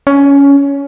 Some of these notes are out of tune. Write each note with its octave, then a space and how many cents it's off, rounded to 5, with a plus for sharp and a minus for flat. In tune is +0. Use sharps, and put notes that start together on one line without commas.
C#4 +15